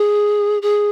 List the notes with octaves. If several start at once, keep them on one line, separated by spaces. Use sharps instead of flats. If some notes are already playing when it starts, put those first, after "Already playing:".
Already playing: G#4
G#4